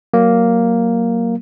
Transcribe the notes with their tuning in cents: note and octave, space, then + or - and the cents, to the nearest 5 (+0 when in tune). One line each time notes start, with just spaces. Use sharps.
F#3 +15 A#3 +0